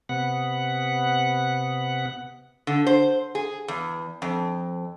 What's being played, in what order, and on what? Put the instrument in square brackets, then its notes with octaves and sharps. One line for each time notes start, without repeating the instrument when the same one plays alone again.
[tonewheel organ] C3 B3 F#5
[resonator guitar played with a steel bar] D3
C5
G#4
E2
F2